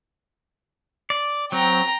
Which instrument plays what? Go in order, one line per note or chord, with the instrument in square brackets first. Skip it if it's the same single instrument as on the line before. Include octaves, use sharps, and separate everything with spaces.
[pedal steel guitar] D5
[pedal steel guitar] F#3 C4 [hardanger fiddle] G5 A#5